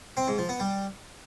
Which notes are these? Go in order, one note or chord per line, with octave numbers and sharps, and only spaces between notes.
C4
G#2
F3
B3
G3